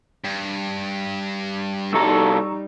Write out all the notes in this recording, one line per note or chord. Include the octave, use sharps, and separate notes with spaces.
G2
C2 G3 D#4 A4 A#5 C#6 E6